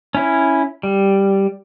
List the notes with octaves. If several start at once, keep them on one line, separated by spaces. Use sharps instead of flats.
C#4 E4
G3